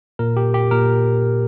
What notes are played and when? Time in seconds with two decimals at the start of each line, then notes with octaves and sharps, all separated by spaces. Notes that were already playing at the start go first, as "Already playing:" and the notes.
0.19 A#2 A#4
0.37 G4
0.54 G4
0.71 A#2 A#4